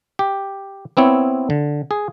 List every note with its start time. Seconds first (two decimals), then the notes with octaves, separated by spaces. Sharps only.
0.19 G4
0.97 B3 C4 E4 C#5
1.50 D3
1.91 G#4